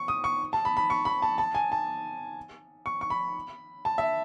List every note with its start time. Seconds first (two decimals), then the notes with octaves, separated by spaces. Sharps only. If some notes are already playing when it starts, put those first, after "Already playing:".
Already playing: C#6
0.08 D#6
0.24 C#6
0.53 A5
0.65 B5
0.77 B5
0.90 C#6
1.05 B5
1.22 A5
1.38 A5
1.55 G#5
1.72 A5
2.86 C#6
3.01 C#6
3.10 B5
3.85 A5
3.98 E5